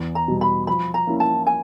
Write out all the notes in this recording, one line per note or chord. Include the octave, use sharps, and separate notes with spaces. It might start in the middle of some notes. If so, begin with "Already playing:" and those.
Already playing: E2
A#5
B2 G3
B5
F3 B5
A#5
A#3 C#4 E4
A5
G#5